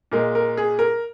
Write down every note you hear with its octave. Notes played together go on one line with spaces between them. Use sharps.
A#2 G#3 A#4
A#4
G#4
A#4